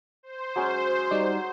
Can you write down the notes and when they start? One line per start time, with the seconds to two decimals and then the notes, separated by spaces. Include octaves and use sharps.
0.23 C5
0.56 F#3 G#3 C#4
1.11 G3 D#4 D5